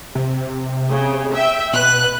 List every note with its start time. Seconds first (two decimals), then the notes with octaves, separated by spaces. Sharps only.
0.15 C3
0.90 C#3
1.34 E5 G5
1.73 B2 B4 F#6